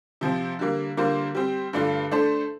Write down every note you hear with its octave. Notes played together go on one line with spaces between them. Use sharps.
C3 F3 C4
D3 G3 A#3
D3 G3 A#3 F4 C5
G3 C4 G4
G2 D3 A3 D4 F4
A3 D4 A4 C5